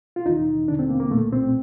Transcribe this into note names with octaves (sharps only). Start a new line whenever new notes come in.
F4
D#2 D#3 D#4
D#2 D3 D4
C4
A#3
A#3
C2 A#2 A3
C4